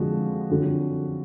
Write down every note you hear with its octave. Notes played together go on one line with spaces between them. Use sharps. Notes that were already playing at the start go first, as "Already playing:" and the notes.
Already playing: F2 D3 F3 G#3 F#4
F2 D3 F#3